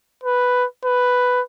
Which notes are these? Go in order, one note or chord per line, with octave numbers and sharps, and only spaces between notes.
B4
B4